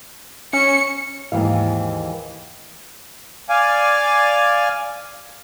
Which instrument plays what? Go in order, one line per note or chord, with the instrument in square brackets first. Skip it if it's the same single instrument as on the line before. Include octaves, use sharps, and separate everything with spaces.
[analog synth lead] C#4 [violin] C#7
[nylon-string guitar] D#2 G#2 E3 F5
[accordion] D5 F5 G#5